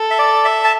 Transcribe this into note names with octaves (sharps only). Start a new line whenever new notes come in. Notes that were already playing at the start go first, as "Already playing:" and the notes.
Already playing: A4
E5
D5
E5
A5